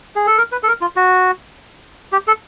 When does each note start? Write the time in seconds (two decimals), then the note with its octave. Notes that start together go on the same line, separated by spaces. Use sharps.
0.16 G#4
0.27 A4
0.38 A#4
0.52 B4
0.63 A4
0.68 A#4
0.81 F4
0.96 F#4
2.12 G4
2.27 A4